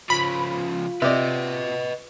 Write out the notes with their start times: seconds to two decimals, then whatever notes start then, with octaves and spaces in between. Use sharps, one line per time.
0.10 C#3 F3 F4 B5
1.02 C3 B4 D5 D#5